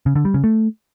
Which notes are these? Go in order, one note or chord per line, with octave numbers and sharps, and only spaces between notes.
C#3
D3
G3
C#3
A3